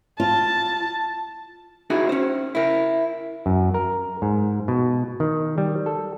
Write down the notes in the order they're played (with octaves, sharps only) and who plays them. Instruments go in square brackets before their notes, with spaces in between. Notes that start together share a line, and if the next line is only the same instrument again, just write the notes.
[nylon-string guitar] F4 [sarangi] A5
[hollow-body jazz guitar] D#4 E4 F#4 G#4
C#4 C5
E4 A#4
[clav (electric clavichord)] F#2
A#4
G#2
B2
D#3
G3
A4